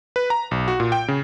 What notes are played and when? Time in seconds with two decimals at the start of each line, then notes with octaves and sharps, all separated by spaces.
0.16 B4
0.30 A#5
0.51 B1
0.68 F#4
0.80 A#2
0.92 G5
1.08 C#3